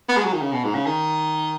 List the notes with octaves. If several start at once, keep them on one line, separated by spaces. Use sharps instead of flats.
B3
G#3
F#3
D#3
C#3
B2
G#2
C#3
D#3